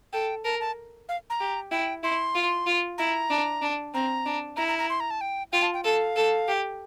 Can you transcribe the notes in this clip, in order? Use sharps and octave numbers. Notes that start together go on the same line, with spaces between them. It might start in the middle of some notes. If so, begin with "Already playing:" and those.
A4 G5
A#4 A5
A5
F5
A#5
G4
E4 G5
E4 C6
F4
F4
E4 A#5
D4
D4
C4 A#5
D4
E4 A#5
A#5
A#5
C6
A#5
A5
G5
F4 G5
A5
G5
A4 F5
A4
G4